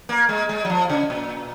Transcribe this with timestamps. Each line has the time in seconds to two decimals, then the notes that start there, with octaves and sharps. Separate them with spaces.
0.09 A#3
0.29 G#3
0.49 G#3
0.65 F#3
0.70 F3
0.90 C#3
1.10 A#2